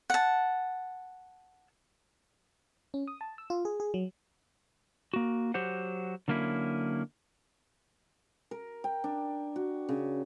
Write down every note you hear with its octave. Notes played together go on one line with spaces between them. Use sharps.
F#5 A5
C#4
D#6
A5
E6
F4
G#4
G#4
F#3
A#3 F#4
F#3 G4 C5 F#5
D3 F#3 A#3 C#4 E4
A#4
G5
D4
F#4
C#3